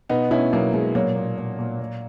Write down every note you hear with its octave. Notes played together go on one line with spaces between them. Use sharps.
B2 B3 D#4
B2 C#4 E4
B2 F#3 A#3
B2 G#3
A#2 F#3 A#3
A#2
A#2
A#2
A#2